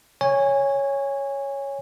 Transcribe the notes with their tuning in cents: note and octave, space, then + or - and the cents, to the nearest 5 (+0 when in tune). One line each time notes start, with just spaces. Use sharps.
C#5 +0 G#5 -20